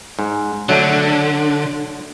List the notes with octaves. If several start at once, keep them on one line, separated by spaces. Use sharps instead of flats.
G#2
D3 F#3 A3 D4